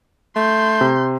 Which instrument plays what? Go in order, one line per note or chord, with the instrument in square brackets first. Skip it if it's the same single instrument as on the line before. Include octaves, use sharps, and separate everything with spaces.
[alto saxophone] A3 [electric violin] C6 G6
[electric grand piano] C3